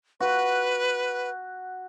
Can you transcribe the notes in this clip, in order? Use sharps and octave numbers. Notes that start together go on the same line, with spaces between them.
F#4 B4